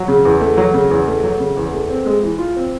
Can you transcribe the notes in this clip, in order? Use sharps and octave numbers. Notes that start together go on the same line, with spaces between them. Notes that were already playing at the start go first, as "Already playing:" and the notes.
Already playing: F#3
C#3
E2
A3
F#3
C#3
E2
A3
F#3
C#3
E2
A3
C4
G#3
E3
F4
C4